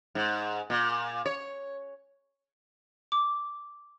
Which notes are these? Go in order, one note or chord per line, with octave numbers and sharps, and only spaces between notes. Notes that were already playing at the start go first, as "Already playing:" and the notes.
G#2
A#2
C#5
D6